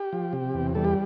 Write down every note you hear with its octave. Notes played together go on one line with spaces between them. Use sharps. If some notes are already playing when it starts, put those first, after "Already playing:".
Already playing: G4
F3
C3
E2
G3 A4
G4